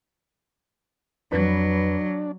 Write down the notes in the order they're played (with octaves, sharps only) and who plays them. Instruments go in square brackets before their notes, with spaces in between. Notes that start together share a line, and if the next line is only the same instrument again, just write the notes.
[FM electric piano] F2 B4 B5 [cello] F#3 [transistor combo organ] D4